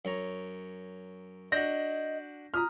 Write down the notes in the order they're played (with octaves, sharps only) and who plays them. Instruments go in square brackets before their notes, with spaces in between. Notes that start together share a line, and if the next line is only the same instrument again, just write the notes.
[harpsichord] F#2 C#5 A#5
[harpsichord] D4 F#4 [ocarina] D#5 [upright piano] G6 A#6
[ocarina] F4 [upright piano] A#5 D#6 F6